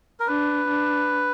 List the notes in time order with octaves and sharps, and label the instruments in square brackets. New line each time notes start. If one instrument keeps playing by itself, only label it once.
[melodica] A#4
[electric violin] D4 [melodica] B4
[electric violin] D4